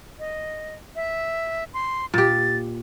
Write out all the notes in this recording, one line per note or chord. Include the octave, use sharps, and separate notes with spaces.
D#5
E5
C6
A#2 G4 A6